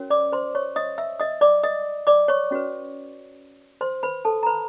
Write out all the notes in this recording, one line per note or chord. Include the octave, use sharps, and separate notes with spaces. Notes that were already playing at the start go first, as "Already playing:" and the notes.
Already playing: C#4 F#4 A#4 C#5
D5 D6
C5 C6
C#5 C#6
D#5 D#6
E5 E6
D#5 D#6
D5 D6
D#5 D#6
D5 D6
C#5 C#6
C#4 F#4 B4
C5 C6
B4 B5
A4 A5
A#5
B4 B5